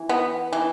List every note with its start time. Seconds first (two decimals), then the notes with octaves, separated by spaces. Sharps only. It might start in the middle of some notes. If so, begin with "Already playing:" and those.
Already playing: E3
0.09 B3
0.53 E3